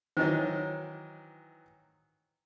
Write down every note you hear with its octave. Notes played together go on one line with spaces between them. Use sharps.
D#3 E3 F#3 C5 D#5